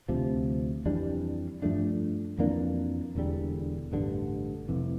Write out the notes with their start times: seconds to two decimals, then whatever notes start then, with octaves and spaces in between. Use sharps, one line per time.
0.09 D2 C3 F3
0.86 F2 E3 G3 D4
1.62 G2 F3 A3 D4
2.38 F2 E3 A#3 D4
3.15 E1 E2 D3 G3
3.92 A1 G2 D3
4.68 F1 F2 C3 E3